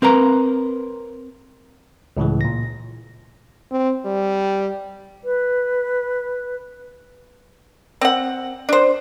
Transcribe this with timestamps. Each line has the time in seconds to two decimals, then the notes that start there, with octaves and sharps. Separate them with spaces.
0.02 C4 A#4 B4 A#5
2.17 C#2 A2 C#3 E3
2.41 A#2 A#6
3.71 C4
4.05 G3
5.24 B4
8.01 C4 F#5
8.69 D4 C5